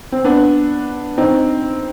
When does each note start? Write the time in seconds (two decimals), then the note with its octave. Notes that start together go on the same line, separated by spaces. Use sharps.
0.12 C4
0.24 B3 D4
1.18 C4 D#4